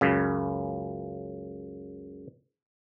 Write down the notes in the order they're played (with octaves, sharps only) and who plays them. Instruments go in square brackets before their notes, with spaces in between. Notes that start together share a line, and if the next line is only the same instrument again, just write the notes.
[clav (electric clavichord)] C#2 F#2 C#3